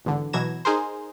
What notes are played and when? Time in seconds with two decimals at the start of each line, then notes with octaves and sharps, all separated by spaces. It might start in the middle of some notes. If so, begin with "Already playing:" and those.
0.05 G#1 E2 D3
0.33 B2 E3 F#3 G#6 A#6 E7
0.65 D#4 G#4 A#4 C5